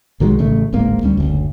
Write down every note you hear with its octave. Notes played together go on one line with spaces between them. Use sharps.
B1 D#3 F#3 G#3
A1 C#3 A3
D1 G#1 G#2 A#3
D2 G3 C#4
F#1 D2